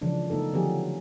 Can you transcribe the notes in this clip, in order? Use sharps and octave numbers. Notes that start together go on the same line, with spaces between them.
C#3 E3 F3 G#3 D4
C#3 A3 B3 D#4 A4
D3 F3 F#3 B3 G4 G#4